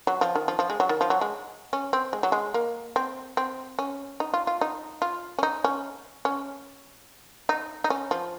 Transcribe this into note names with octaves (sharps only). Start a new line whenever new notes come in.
F#3
F3
D#3
F3
F3
G#3
F#3
D#3
F3
F#3
G#3
C#4
C4
G#3
F#3
G#3
A#3
C4
C4
C#4
D#4
F4
F4
D#4
F4
C#4
D#4
C#4
C#4
D#4
D#4
C#4
F3